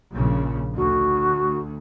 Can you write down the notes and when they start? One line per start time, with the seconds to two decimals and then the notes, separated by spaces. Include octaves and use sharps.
0.12 A#1 C#3
0.76 D2 F#4